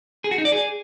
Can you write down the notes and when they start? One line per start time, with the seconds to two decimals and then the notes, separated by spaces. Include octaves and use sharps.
0.24 G#4
0.31 F#4
0.38 D#4
0.45 D5
0.52 G#4